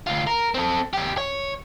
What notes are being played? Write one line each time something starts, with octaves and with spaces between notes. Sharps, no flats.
D2 F4
A#4
C4 A4
E2 G4
C#5